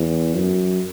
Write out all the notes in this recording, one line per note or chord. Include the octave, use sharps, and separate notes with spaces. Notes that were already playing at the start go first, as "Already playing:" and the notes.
Already playing: E2
F#2